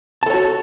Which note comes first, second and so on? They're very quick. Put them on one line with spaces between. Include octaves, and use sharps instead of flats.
A5 A4 C#5 F#4